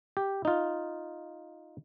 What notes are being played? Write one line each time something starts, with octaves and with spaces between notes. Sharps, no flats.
G4
D#4 F4